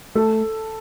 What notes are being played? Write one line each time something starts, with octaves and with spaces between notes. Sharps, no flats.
A3 A4